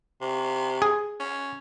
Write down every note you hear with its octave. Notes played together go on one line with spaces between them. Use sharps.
C3
G#4
C#4